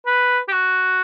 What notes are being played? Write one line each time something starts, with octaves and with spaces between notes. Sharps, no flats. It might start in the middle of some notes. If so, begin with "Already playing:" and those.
B4
G4
F#4